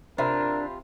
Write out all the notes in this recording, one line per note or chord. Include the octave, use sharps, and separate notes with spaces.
C3 D4 F4 A#4 C5 E5 B5